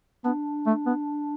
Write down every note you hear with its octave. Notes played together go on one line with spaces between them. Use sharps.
B3 D4
A3
B3